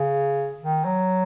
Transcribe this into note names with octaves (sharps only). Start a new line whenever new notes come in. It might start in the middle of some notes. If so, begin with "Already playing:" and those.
Already playing: C#3
D#3
F#3